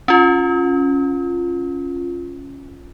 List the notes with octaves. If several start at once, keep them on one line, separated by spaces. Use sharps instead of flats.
C#4 F4